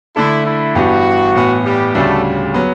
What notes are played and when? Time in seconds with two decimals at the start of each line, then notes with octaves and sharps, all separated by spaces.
0.16 D3 A3 D4 E4 A4
0.45 E4
0.75 G2 E3 B3 D4 F#4 G4
1.35 A2 E3 B3
1.65 G3 G4
1.95 D2 C#3 G3 A3 D4 F#4 A4
2.54 F#3 B3